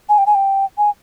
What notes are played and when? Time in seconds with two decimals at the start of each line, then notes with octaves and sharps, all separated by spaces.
0.09 G#5
0.18 G5
0.26 G#5
0.35 G5
0.78 G#5